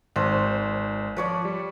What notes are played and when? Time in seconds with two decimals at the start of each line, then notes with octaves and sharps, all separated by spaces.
0.16 G#1 C5 A5 F#6
1.17 F3 B4 C#5 D5
1.45 G3